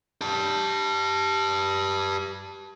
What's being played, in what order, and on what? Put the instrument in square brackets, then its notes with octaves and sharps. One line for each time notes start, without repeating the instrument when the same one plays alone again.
[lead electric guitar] G4 A5